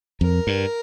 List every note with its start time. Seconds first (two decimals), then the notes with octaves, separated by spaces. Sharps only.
0.21 F2 A#4
0.47 G2